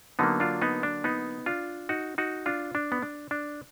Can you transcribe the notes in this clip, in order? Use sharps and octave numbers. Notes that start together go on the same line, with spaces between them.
D3 F#3 A#3 B3 D#4
D4 F4
B3 D#4
D4
B3 D#4
D4 F4
D#4 F#4
D#4 F#4
D4 F4
D4
B3
D4
D4